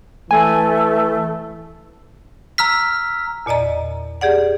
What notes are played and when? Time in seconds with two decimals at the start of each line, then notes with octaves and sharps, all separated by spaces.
0.31 E3 A3 G#5
2.58 A#5 E6 F6 B6
3.46 E2 A#2 D5 D#5 A#5
4.21 G4 G#4 D5 F#5